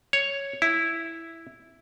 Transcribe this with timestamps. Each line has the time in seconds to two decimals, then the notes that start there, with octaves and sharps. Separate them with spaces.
0.13 C#5
0.62 E4